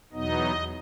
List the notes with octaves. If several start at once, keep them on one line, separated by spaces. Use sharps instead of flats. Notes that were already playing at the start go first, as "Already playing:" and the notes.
E2 B2 F#3 B3 D#4 D#5